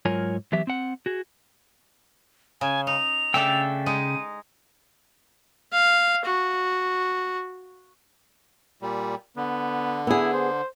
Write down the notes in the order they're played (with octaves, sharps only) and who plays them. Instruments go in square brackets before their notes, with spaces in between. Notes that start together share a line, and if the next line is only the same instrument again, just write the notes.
[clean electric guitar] G#2 F#3 F4 A#4 C#5 G#5
E3 F#3 B3 G4 E5
C4 F#5
F#4 G#4
[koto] C#3 [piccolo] G#5
[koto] D#4 [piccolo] F7
[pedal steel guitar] C#3 G5 E6 [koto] A3 D4 A4
[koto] G#3 D#4 [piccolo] D#7
[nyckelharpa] F5
F#4
[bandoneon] A#2 G3
[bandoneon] D3 [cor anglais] B3
[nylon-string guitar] B3 G#4 [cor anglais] E4
[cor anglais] C5